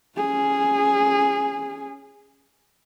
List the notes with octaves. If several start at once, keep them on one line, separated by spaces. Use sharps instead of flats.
C#4 G#4